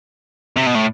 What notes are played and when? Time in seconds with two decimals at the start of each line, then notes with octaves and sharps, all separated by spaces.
0.56 C3
0.66 B2
0.75 A2